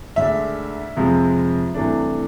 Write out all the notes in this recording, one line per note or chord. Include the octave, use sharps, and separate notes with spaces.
D2 D3 G#3 D4 E5
F2 C3 F3 G#3
C2 C3 E3 A3 D4